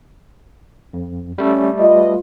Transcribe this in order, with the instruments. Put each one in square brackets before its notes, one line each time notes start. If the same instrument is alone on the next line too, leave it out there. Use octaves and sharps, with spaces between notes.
[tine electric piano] F2
[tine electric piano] G3 A3 A4 [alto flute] C#4
[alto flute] F4 [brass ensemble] B4 D#5